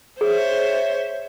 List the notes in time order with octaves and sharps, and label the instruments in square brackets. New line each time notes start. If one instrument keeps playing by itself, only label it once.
[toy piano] G#4 [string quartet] C5 C#5 E5